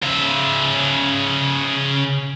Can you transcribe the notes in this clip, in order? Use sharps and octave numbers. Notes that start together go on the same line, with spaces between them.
C#3 E5